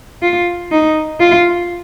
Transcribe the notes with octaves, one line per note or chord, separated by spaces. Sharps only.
F4
D#4
F4